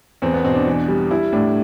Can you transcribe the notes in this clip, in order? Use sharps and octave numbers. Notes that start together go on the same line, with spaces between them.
E2 C4
B3
B2 C4
D4
E3
G3
G3 E4
A2 D4